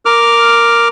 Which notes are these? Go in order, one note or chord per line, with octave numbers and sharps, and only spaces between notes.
A#4 D6 F6